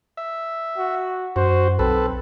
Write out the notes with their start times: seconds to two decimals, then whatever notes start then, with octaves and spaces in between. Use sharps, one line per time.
0.17 E5
0.78 F#4
1.36 F#2 F#4 C5
1.79 B1 C4 A4 B4